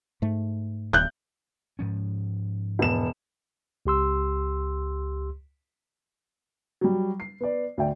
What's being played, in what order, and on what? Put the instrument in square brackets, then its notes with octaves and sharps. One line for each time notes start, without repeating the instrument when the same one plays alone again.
[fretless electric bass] G#2 A3
[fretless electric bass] D1 [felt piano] F#6 G6
[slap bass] G#2 F3 C#4
[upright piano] E1 B3 E7
[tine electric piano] C#2 G4 C6 E6
[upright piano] F#3 G3
C7
B3 D5
D2 D5 E5 G5